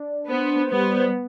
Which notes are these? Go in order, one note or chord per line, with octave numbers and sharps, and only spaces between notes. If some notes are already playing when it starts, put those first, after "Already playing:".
Already playing: D4
B3 C5
G3 B3